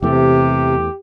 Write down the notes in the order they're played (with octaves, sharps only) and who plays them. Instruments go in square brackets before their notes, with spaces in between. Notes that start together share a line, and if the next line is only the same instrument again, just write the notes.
[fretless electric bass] E2 E3 A3 [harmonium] C3 [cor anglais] G4